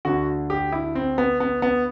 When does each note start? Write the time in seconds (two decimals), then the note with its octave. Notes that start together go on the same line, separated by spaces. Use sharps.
0.05 D2 D3 F#4
0.50 G4
0.72 E4
0.95 C4
1.18 B3
1.40 B3
1.62 B3